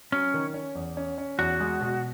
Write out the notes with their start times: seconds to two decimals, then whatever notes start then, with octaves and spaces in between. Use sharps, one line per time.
0.12 F#3 C#4
0.34 D#3
0.54 C#4
0.75 E2
0.97 C#4
1.18 C#4
1.39 E2 F#4
1.60 G#3
1.81 B2